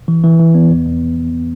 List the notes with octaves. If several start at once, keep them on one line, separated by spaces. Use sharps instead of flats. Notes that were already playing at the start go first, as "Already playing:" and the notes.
E3
E3
E3
B3
E2
E2